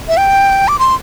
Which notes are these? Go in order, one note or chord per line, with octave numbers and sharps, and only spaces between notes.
E5
G5
D6
C6